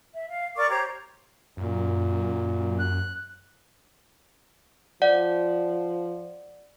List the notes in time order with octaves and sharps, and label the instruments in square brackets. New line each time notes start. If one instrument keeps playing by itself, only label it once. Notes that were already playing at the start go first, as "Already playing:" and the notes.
[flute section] E5
F5
A#4 D5 C#6 D6
G4 C5 C#5 A#5
[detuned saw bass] F#2 [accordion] A#2
[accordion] F#6
[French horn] F3 [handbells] D5 F#5